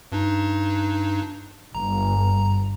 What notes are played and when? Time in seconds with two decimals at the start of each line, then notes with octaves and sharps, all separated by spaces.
0.12 G2 D4 D#4
1.75 G1 A#5